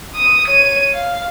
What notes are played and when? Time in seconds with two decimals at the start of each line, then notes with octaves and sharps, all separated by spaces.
0.15 D#6
0.47 C#5 D#7
0.93 F5